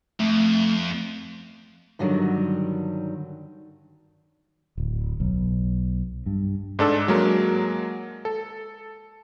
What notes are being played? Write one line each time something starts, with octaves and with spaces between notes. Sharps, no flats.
F2 A3
G2 D3 D#3 F#3 G3
D1
B1
G2
G#2 D4 A4 E6
F#3 G#3 A#3 A#4
A4